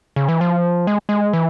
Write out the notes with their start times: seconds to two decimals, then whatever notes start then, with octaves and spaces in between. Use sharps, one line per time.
0.16 C#3
0.28 E3
0.41 F3
0.87 G#3
1.09 G#3
1.33 E3